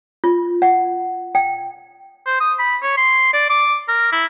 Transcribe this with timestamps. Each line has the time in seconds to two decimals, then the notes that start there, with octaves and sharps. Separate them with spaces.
0.24 F4
0.62 F#5
1.35 G5
2.26 C5
2.40 D#6
2.59 B5
2.83 C#5
2.97 C6
3.33 D5
3.50 D6
3.88 A#4
4.12 E4